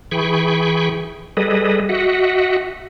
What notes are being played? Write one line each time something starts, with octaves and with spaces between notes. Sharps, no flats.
E3 G#4 G5 B5 C#6
G3 G#4 A4 B4 D#5
F#4 D#5 E5 F#5